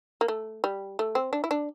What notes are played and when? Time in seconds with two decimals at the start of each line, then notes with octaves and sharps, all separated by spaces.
0.21 A#3
0.28 A3
0.64 G3
0.99 A3
1.15 C4
1.33 D4
1.44 E4
1.51 D4